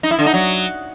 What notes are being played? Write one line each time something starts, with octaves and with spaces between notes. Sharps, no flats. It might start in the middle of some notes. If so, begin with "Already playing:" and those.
D#4
E4
D3
D#4
F#3